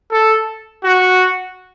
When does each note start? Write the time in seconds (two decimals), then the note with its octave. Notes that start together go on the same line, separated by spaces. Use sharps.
0.11 A4
0.84 F#4